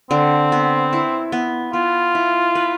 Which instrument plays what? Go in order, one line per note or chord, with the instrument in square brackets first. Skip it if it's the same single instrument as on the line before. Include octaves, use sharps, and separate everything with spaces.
[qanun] D3 [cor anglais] C4
[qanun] B3
E4
B3
[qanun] B3 [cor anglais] F4
[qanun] E4
B4